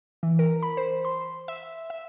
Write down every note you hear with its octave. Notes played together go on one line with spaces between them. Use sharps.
E3
A#4
B5
C5
C6
E5
E5